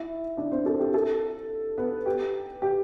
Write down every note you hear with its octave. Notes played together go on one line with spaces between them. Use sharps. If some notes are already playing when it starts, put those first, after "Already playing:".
Already playing: E4 E5
D4 D5
C4 C5
A4
G4
A4
B3 B4
G4
G4